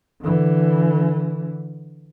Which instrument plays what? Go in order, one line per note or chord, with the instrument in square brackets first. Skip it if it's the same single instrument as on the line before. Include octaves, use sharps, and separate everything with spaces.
[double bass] D3 E3